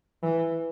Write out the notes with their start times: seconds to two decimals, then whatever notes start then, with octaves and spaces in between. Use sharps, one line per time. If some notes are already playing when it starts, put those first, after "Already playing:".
0.23 E3